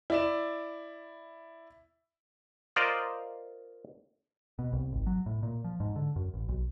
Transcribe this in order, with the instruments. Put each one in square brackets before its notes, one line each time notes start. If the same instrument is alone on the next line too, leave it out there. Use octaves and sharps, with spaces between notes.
[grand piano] E4 D5 E7
[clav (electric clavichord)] F4 A#4 C5 D5 D#5 F5
[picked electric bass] B2
C2
G#1
F#3
A2
A#2
F3
G#2
D3
F#2
A1
B1